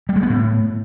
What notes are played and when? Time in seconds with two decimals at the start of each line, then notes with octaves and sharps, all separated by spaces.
0.09 G3
0.16 G#3
0.23 B3
0.30 A2